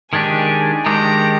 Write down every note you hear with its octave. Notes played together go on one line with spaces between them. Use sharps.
D#3 G#3 D4 G4 G#5
D#3 G#3 D4 G4 A#5